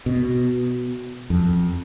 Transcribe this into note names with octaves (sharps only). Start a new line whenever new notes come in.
B2
F2